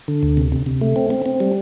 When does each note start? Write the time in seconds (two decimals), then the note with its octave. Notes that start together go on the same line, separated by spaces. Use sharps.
0.08 D3
0.23 D2
0.37 C3
0.52 C3
0.66 C3
0.81 A3
0.96 C4
1.10 C4
1.26 C4
1.40 G3